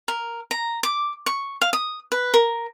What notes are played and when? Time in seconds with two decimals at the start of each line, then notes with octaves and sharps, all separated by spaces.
0.08 A#4
0.51 A#5
0.83 D6
1.26 C#6
1.61 F5
1.73 D#6
2.12 B4
2.34 A#4